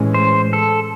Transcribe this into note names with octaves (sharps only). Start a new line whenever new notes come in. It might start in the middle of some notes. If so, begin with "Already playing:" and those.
Already playing: A2 E3 G#3 C#4
C5
A4